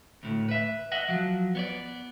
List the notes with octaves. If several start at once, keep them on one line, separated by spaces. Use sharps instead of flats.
D2 A2
B4 E5
D#5 E5 F#5
F3 F#3
B3 C#5 D5